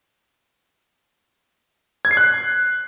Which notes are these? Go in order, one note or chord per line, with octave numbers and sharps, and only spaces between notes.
G#6
C7
F#6